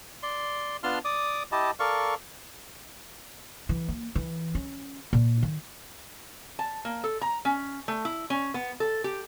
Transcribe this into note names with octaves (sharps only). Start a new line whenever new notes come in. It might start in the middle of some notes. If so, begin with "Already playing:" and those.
D5 C6
B3 D4 F4 A5 C6 F6
D5 D6 D#6
E4 G4 D#5 A5
A4 A#4 D5 F5 C#6
E3
A#3
E3
C#4
A#2
D#3
A5
A#3
A4
A#5
C#4
A3
E4
C#4
B3
A4
G4